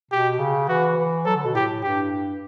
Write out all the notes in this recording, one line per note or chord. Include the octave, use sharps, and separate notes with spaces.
B2 G4
C#3
E3 F#4
E3
F#3 A4
D3
B2
A2 G4
G2 G4